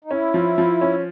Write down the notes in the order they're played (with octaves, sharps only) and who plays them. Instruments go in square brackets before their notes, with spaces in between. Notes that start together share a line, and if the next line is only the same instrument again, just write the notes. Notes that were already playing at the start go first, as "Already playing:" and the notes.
[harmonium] D#4
[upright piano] C#4 [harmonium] E4
[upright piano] F3
F3
C#4